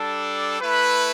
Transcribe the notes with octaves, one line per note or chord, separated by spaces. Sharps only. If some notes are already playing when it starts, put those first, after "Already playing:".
Already playing: G3 D4 A4
A3 E4 B4